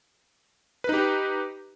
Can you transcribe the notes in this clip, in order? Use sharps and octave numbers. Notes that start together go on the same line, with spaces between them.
D#4 G4 B4